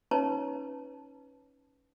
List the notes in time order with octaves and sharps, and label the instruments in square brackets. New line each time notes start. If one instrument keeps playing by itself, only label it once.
[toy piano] C#4 D#4 B4 C#5 A5 A#5